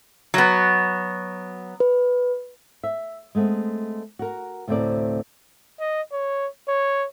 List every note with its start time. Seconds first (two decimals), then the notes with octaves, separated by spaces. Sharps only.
0.34 F#3 B3
1.80 B4
2.84 E5
3.35 G#3 A3 B3 C4
4.19 F#4 A#4
4.68 D2 A2 C3 C4 A#4 D5
5.80 D#5
6.13 C#5
6.68 C#5